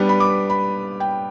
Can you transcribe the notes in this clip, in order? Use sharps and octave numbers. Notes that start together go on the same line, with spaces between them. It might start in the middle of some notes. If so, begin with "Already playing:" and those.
Already playing: G3 B3 D4 G4 B4
B5
D6
B5
G5